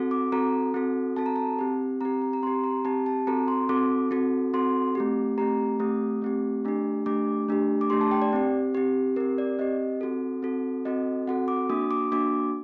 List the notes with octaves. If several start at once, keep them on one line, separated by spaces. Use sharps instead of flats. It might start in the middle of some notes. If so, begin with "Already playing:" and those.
Already playing: C4 F#4 A4
D6
C4 F#4 A4 A#5
C4 F#4 A4
C4 F#4 A4 A5
A#5
A5
C4 G4
C4 G4 A#5
A#5
A#5
C4 G4 C6
A#5
C4 G4 A5
A5
C4 F#4 A4 A#5
C6
C4 F#4 A4 D6
C4 F#4 A4
C4 F#4 A4 C6
A3 C4 G4
A3 C4 G4 A#5
A3 C4 G4 D#6
A3 C4 G4
A3 D4 G4
A3 D4 G4 D6
A3 D4 G4
D6
A3 D4 G4 C6
A5
G5
D5
C4 G4
C4 G4
C4 G4 A#4
D5
C4 G4 D#5
C4 F#4 A4
C4 F#4 A4
C4 F#4 A4 D#5
C4 F#4 A4 F#5
D6
A#3 D4 F#4 D#6
D6
A#3 D4 F#4 D6